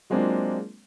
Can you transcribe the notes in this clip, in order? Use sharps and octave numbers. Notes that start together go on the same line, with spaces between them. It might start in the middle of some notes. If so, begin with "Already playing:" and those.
F#3 G#3 A#3 C4 D4 F4